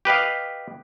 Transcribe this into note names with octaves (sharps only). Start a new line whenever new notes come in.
G4 B4 D#5 F5